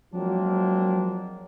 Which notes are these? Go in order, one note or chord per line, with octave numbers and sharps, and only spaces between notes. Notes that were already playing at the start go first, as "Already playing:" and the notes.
F3 F#3 G#3 A#3 C4 D4